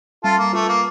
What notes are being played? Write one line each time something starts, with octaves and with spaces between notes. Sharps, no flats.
G3 F4 A4
A#3
A3 F4
A#3